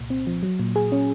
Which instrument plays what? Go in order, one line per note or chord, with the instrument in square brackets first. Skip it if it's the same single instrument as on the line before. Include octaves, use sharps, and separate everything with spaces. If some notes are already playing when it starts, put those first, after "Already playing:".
Already playing: [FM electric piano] C2 A#2
C4
F3
F#3
A#2
G#4
C#4